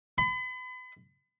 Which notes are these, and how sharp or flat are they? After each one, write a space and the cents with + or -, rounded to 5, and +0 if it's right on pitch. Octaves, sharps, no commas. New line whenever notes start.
B5 +40